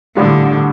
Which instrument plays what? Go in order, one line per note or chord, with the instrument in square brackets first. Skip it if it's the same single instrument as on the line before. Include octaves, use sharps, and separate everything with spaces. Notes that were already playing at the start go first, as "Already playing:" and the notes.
[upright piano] A#1 A2 G3 D4 F4 [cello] D3